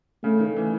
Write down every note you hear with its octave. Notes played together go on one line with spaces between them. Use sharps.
C#3 A3
D#3
E3